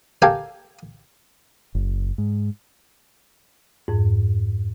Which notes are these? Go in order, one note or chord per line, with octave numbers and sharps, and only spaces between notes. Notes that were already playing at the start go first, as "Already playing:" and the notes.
G4 A4 A#4 F5 G5 G#5
F#1
G#2
F2 G#2